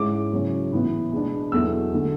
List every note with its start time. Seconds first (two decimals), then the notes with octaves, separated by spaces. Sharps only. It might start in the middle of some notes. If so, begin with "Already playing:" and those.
Already playing: G#2 G#3 C#4 E4 D6
0.32 C#3 F#3 C#4 E4
0.72 A2 E3 B3 E4
1.12 B2 G#3 B3 D4
1.52 E2 B2 F#3 A3 E4 E6
1.93 D3 A3